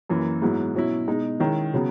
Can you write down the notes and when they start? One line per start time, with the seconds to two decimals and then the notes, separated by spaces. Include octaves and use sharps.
0.09 F#2 E3 A#3
0.42 G#2 F#3 B3 E4
0.75 B2 F#3 C#4 E4
1.08 B2 G#3 D#4
1.40 D#3 G#3 C#4 E4
1.74 C#3 F#3 B3